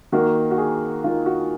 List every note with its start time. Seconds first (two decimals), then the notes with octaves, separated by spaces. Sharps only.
0.12 D#3 A#3 F#4
0.51 F#4
0.58 G#4
1.04 D#3 A#3 F4
1.26 F#4